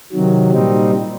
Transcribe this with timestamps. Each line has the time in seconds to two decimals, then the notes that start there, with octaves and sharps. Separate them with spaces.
0.12 C3 D#3 F#3
0.52 A#2 G3 C4 D#4